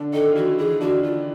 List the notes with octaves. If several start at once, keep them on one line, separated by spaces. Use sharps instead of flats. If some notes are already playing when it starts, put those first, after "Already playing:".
Already playing: D3 D4
D#3 D#4 A4
F4
E3 E4 F#4
E3 E4 G#4
D3 D4 F#4
F4